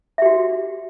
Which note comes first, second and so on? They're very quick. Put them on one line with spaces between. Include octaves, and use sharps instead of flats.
E5 G4 F#4